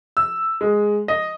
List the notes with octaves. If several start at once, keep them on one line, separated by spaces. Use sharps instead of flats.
E6
G#3
D#5